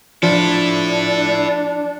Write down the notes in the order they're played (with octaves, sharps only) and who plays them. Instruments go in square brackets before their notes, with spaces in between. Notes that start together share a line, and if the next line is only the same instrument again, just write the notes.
[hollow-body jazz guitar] F3 [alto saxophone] D4 [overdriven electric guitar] E4 A4